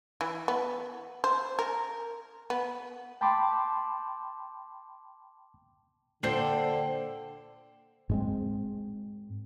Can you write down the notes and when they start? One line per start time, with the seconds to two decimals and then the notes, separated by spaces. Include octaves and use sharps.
0.21 E3
0.48 B3
1.24 C5
1.59 A#4
2.50 B3
3.21 G5 A5 B5 C6 D6
6.23 A#2 D3 A4 C5 D5 G5 C7
8.09 G#2 G#3 C4